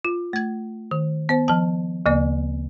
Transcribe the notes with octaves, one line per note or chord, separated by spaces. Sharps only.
F4
A3 G#6
D#3
B3 C5
F3 A5
D2 C#3 A#3 D5